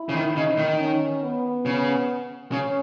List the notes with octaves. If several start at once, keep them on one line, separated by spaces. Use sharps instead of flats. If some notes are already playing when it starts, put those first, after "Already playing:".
Already playing: E4
C#3
D#3
C#3 D#4
D#3
C#4
B3
C#3
C#3 C#4